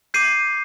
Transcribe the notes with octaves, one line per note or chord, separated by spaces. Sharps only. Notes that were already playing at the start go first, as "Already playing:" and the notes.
D6 G6 C7 D#7